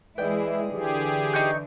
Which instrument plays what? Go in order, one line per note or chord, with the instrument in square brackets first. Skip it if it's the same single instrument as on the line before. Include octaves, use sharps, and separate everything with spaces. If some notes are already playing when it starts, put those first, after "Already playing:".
[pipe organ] E3 [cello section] G#3 E4 G#4 [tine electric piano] B4 D5 [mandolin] G5
[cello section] D3 E3 [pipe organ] G4 G#4
[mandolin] D#4 C#6 G6